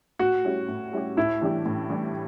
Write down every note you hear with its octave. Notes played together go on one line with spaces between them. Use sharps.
A2 F#4
G3 C#4 E4 G4
A2
G3 C#4 E4 G4
A2 E4
E3 G3 D4 G4
A2
E3 G3 D4 G4